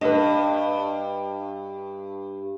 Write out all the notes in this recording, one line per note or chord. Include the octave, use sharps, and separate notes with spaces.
G2 B4 D#5